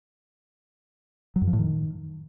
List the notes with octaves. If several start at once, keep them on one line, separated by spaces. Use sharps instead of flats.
F#3
F#2
F3
A2
D#3